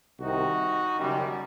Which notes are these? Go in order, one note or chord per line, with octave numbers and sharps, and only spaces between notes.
C2 C3 D#3 D#4 F#4
F#1 F#2 D#3 G3